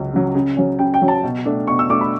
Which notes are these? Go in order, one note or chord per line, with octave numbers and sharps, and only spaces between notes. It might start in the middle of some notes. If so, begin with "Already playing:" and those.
Already playing: C#2 C#3 F#3
C#3 F#3
C#3
F#3 C#4
C#3 G5
G5
F#3 C#4
A5
B2
A3 D4
B2 C#6
E6
A3 D4 D6
B5